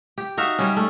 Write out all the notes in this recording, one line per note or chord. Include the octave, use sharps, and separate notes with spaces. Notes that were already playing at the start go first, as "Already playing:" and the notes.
G4
D#4 F#4 E5 F5
G3 C#4
A3